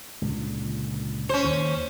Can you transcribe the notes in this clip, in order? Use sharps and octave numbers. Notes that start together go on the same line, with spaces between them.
C#2 A#2 D3
C#4 C5
D#2